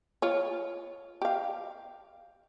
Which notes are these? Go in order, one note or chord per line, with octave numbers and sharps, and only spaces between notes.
F4 C#5
G4 F5